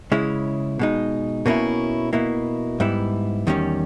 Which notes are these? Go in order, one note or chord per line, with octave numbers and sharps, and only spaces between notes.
C#3 G#3 C#4 E4
B2 G#3 D#4
B2 A#3 C#4 E4
B2 A#3 E4
G#2 G3 B3 E4
E2 D#3 G3 C#4